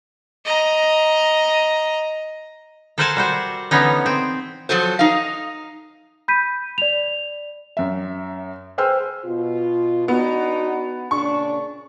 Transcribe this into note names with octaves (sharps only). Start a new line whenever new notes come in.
D#5 A#5
A4 A#4 C5 F#5 G#5 A5
G3 F#4 C5
D3 E3 B3 C#4 D#4
C4
F3 F#3 A4 C5
D#4 F5
B5 G6 B6 D#7
D5 F7
F#2 E5
G#4 B4 C5 G5 E6 F6
B2 F4
B3 D4 D#4 F#4
A#2 C#3 D4 C#6